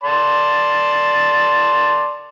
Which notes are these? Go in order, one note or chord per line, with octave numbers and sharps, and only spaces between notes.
D5 A5 C6